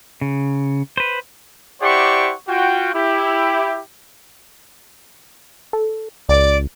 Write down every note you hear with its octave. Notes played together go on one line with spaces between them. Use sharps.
C#3
B4 C5
E4 G4 C5 D5 F#5 C#6
F4 F#4 G5
E4 G4
A4
C#2 D5